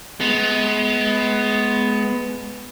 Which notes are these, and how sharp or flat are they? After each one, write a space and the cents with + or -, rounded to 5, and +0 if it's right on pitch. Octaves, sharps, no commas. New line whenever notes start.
G#3 +35 B3 +10